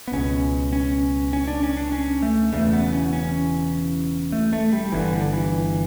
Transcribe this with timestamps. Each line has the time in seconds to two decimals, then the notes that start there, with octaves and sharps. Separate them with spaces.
0.08 B3
0.12 C#2 B2 C#4
0.73 C#4
1.33 C#4
1.48 D4
1.63 C#4
1.77 D4
1.92 C#4
2.22 A3
2.53 E1 E2 C#3 A3
2.73 B3
2.92 C#4
3.13 C#4
4.32 A3
4.53 A3
4.72 G3
4.92 G1 G2 D3 E3
5.13 D3
5.33 E3